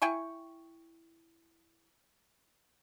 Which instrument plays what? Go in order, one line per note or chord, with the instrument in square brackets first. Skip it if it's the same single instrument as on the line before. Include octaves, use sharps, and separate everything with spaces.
[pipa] E4 G5 G#5 C#6